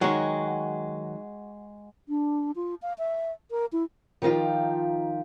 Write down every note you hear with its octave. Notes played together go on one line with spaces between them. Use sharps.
D#3 F#3 G#3 F#4
D4
F4
F5
E5
A#4
E4
D#3 F3 D#4 F4 G4